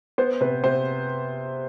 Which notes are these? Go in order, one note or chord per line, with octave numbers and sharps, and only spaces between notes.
B3 C5
C3 B4
C3 C5